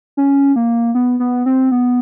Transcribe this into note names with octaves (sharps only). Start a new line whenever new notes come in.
C#4
A#3
B3
B3
C4
B3